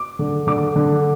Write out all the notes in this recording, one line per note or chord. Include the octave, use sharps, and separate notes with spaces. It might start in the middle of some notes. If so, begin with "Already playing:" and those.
Already playing: D6
D3
D3 D6
D3